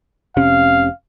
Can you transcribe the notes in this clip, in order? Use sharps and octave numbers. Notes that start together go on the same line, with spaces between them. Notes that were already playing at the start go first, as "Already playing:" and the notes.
F1 C3 C#4 F5